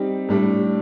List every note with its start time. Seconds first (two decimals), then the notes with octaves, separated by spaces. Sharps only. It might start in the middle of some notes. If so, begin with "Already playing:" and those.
Already playing: G3 C4 D#4 G4
0.29 A2 G3 D4